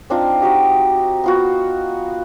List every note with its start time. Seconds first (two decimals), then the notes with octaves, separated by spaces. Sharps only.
0.10 C4 D4 D#4 F4
0.41 D#4 F#4 G4 D#5
1.24 B3 F4 F#4